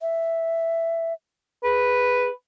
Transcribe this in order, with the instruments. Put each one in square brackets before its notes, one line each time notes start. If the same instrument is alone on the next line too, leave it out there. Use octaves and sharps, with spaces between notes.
[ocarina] E5
[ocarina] G#4 [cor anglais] B4